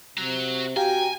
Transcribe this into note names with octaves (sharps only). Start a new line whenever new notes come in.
C3 F#4 A#5
F#4 G4 F5 G5 G#5 A#5